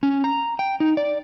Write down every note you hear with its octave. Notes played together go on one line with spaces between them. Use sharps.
C#4
A#5
G5
D#4
D5